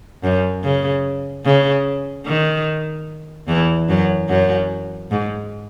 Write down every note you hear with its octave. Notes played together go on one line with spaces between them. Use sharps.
F#2
C#3
C#3
D#3
E2 E3
F#2 F#3
F#2 F#3
G#2